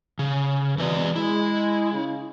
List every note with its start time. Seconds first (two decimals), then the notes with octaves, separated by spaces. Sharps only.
0.19 C#3
0.78 B2 E3 G#3 B4 D5
1.16 G#3 E4
1.92 C#3